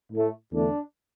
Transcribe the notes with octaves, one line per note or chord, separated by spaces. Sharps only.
A2 A3
E2 D3 A3 D4